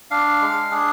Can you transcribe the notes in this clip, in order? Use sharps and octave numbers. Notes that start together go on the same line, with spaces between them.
D4 F5
G#3
D4 G#4